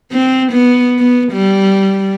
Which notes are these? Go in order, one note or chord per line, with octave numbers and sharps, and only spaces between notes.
C4
B3
B3
G3